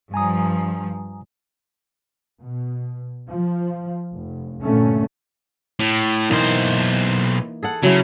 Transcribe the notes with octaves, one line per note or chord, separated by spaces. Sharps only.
G2 F3 G#5 A#5 D#6
B2
F3
F1
G2 A#2 D3 A3 C#4
A2
B1 E3 A#3 D#4 C5
G#4 A4 F#5
C#3 F#3 E4